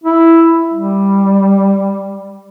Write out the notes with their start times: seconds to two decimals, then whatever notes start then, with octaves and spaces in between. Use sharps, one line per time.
0.04 E4
0.73 G3